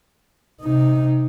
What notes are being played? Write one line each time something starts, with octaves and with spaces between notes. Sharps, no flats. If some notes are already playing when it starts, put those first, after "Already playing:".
C3 D#4